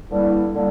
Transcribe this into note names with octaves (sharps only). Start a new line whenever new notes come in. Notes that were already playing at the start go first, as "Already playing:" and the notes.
G2 D3 G3 A#3 E4
D3 G3 A#3 E4